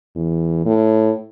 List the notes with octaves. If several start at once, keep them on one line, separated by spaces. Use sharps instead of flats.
E2
A2